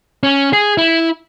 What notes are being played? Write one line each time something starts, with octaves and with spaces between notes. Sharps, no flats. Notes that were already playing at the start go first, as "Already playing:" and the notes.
C#4
G#4
E4